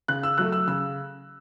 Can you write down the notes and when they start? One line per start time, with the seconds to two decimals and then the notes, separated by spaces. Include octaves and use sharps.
0.08 C#3 F#6
0.23 E6
0.38 F#3 A3 F#6
0.52 E6
0.67 C#3 E6